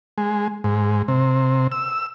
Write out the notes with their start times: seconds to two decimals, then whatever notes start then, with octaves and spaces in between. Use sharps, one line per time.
0.18 G#3
0.64 G#2
1.08 C3
1.72 E6